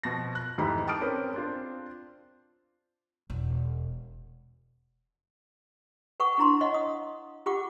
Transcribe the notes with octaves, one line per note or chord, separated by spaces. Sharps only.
B2 F3 A5 A#6
F#6
F2 G#2 E3 D#4 G4 B5
G5 A5 D6 D#6 F6 D7
C4 C#4 A#4 B4
C4 D4 F4
E1
B4 F#5 C#6 D#6
D4 E4 A#5 C6
C#5 D#5 F5 F#5
D#6
F4 G4 F#5 D6